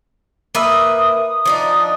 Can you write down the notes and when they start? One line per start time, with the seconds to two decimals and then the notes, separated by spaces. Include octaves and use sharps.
0.55 A#3 B4 E5 D#6
1.46 F3 D4 D#4